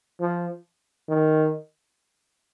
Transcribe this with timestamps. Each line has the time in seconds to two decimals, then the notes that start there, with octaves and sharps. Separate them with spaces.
0.20 F3
1.09 D#3